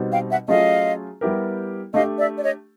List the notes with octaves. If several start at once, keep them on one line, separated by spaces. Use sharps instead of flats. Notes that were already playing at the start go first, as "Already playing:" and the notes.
Already playing: B2 G3 C4 D#4 F#4
F5 G5
E5 F#5
F#3 A3 C#4 F4 G#4 D#5 F5
G3 B3 E4 G4 A#4
A3 D4 G4 D#5 F5
D5 E5
D5
C#5 D#5